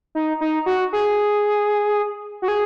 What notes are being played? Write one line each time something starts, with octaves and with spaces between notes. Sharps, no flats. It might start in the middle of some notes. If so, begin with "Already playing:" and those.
D#4
D#4
F#4
G#4
F#4
G#4